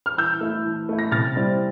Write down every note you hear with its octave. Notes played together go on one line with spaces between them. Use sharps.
F6
E3 E6 G6
A3 E4
E3
A3 E4
A#6
C3 F6 A6
G3 C4 E4